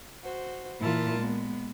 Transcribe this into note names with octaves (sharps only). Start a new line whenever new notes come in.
F#4 C5
A#2 E3 E4 F4 A#4 A5
G#3 B3